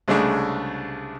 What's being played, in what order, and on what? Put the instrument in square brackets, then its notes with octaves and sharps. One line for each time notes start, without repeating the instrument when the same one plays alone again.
[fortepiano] C2 C#3 G#3 A3 D4